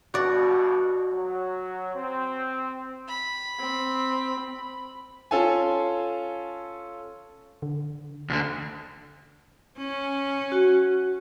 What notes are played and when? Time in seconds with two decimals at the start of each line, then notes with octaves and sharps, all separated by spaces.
0.14 G2 B2 F#4 D5
1.11 F#3
1.94 C4
3.08 B5
3.60 C4
4.40 B5
5.31 C#4 F4 A4 F5 G#5
7.62 D3
8.30 D2 D3
9.78 C#4
10.52 F#4